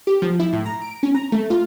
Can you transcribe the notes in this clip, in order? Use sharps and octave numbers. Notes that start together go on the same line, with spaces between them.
G4
F3
E4
A2
A#5
D7
C#4
A#5
A3
F4